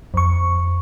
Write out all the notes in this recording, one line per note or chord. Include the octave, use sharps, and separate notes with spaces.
F2 C#6